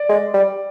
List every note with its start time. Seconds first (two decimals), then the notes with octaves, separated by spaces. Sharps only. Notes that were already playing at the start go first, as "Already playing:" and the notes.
Already playing: D5
0.09 G#3
0.34 G3